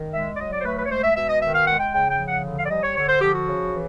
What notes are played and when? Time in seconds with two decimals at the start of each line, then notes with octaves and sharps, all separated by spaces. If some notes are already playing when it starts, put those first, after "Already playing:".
Already playing: D#3
0.13 G#3 E5
0.36 D5
0.39 F#3 D#5
0.52 D5
0.60 C5
0.65 A3 B4
0.78 B4
0.86 C#5
0.91 G#3 C5
1.03 E5
1.16 B2 E5
1.29 D#5
1.42 D#3 E5
1.55 F5
1.67 G#3 F#5
1.80 G5
1.93 C#3 G5
2.10 G5
2.19 F3
2.28 F#5
2.44 D3
2.58 F5
2.65 D5
2.70 G3 D#5
2.83 C#5
2.96 D3 C#5
3.08 C5
3.21 F3 G4
3.35 F#4
3.47 C#3
3.73 E3